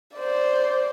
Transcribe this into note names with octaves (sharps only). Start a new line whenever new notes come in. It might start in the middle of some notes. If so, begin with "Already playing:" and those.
C5 D5